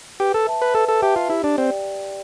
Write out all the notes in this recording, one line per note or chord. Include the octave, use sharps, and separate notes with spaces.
G4 B4
A4
E5 A5
B4
A4 B4
A4
G4 E5 A5
F4
E4 G4
D4
C4 D5 G5